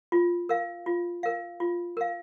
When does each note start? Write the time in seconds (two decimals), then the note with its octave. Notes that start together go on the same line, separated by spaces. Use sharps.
0.12 F4
0.49 A#4 F5
0.86 F4
1.23 A#4 F5
1.60 F4
1.97 A#4 F5